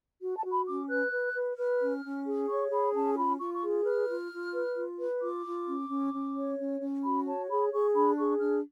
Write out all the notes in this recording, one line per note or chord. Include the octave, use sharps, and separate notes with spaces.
F#4
A5
F#4
B5
C#4 D6
B4 F#6
B4
B4
B4 F6
C#4
C#4
G#4
C#5 C#6
G#4 B5
C#4 A5
F4 B5
F4 C#6
C#6
G#4
B4 F6
F4
F4
B4
F4
B4
F4 D6
F4
C#4
C#4
C#4
C#5
C#4
C#4
F#4 B5
C#5 A5
G#4 B5
G#4 C#6
D4 B5
G#4 C#6
D4 F6